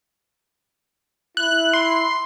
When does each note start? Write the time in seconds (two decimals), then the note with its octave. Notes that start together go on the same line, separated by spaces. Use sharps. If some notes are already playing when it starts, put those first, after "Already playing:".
1.37 E4 F#6
1.73 C6